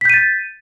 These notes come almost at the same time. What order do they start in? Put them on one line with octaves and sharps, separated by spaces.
B6 G6 D#7 A6